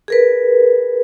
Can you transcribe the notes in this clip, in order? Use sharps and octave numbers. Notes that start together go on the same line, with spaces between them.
G#4 A#4 B4